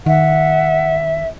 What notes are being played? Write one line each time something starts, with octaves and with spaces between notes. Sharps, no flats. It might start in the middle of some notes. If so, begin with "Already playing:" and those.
D#3 E5 F#5